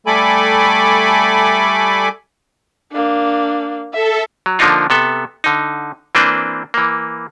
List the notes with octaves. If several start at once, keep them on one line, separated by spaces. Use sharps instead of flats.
G3 A3 A4 G#5 B5 D6
A#3 D4
A4 E5
F#3
D3 F3 A#3 D4 D#4 F4
C3 B3 A4
D3 D#4
E3 A#3 C4 D4 B4 C5
E3 A#3